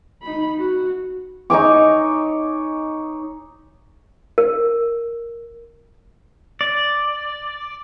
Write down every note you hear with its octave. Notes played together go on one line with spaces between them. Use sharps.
D#4 B5
F#4
D#4 C#5 G#5 D6
A#4
D5